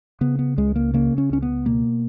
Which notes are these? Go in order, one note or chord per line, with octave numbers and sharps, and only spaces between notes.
C#3 B3
B3
C#2 G#3
A#3
C#3 A#3
C#4
C#2 C#4
B3
B2 A#3